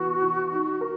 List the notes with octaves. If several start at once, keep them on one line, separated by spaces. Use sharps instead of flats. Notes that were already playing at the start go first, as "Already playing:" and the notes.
Already playing: E3 B3 F#4
E3
D#4
A#4